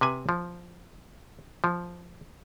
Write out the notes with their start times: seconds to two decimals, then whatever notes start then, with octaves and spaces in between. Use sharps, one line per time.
0.01 C3 B4 G#5
0.29 F3
1.64 F3